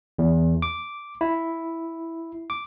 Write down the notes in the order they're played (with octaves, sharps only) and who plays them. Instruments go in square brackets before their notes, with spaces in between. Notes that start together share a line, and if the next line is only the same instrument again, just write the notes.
[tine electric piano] E2
D6
E4
D6